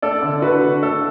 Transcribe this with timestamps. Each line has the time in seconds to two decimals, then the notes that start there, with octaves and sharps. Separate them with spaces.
0.02 A3 A4 D5
0.22 D3
0.42 D4 F#4 B4
0.62 D3
0.82 A3 A4